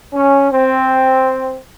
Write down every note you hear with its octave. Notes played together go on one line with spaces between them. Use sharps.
C#4
C4